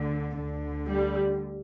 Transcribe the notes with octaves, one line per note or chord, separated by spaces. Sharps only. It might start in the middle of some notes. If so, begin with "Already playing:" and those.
Already playing: D2 D3
D2 D3
G3